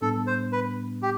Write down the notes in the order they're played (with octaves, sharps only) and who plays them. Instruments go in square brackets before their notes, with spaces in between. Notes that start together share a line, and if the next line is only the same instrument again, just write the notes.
[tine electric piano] A2 G3 B3 D4 [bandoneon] A4
[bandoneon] C5
B4
G4